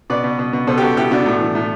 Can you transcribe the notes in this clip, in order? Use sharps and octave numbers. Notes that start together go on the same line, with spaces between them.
B2 B4 D5
B2
B2
B2
B2 A4 C5
G4
B2 F#4 A4
B2 E4 G4
B2 D4 F#4
A2
E3
A2